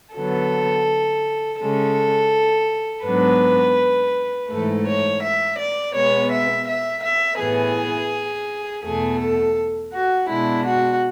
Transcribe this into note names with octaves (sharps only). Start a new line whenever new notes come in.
D3 F#3 B3 A4
C#3 G#3 C#4 A4
G#2 F#3 B3 D4 B4
G#2 E3 A3 A4
C#5
E5
D5
B2 G#3 B3 C#5
E5
E5
E5
A2 E3 B3 G#4
E2 B2 A3 G#4
A4
F#4
B2 G#3 D4 E4
F#4